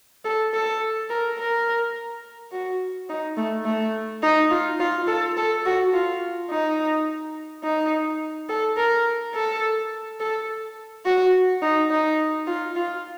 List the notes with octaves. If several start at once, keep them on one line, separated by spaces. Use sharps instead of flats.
A4
A4
A#4
A#4
F#4
D#4
A3
A3
D#4
F4
F4
A4
A4
F#4
F4
D#4
D#4
A4
A#4
A4
A4
F#4
D#4
D#4
F4
F4